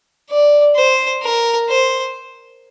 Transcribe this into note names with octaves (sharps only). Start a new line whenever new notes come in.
D5
C5
A#4
C5